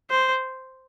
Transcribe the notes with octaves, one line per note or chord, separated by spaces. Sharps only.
C5